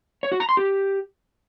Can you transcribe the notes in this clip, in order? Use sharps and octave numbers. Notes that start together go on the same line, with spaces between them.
C#5
F#4
A#5
C6
G4